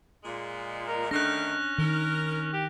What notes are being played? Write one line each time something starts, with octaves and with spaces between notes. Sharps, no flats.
A#2 G#3
A#4
D#3 A3 C#4 D4 F#6 A#6
D#3 A#4
G4